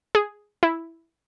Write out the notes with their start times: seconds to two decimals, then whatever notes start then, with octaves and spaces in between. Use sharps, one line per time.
0.15 G#4
0.63 E4